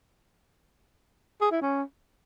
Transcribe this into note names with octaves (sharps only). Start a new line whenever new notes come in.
G#4
E4
C#4